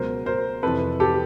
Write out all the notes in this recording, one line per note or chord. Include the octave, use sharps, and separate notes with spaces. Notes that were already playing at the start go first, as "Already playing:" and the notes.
Already playing: C#2 B2 F#3 A#4 C5
A#4 C5
F2 C3 E3 A4 B4
G4 A4